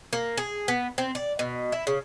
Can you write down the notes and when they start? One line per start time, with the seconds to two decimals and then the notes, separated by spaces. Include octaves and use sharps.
0.13 A#3
0.37 G#4
0.68 B3
0.98 C4
1.15 D5
1.39 B2
1.72 E4
1.87 C#3